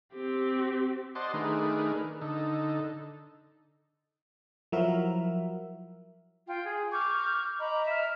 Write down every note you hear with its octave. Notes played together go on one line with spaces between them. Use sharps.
C4 G4
C5 D5 D#5 F#5 A5 C6
D#3 A3 D4 G#4 A#4 B4
D3 D#4 A4
F3 F#3 E4 F#4 A#4 E5
F4 G5
G#4
C#6 D6 F6 G6
D#5 A#5 B5 D6
E5 F6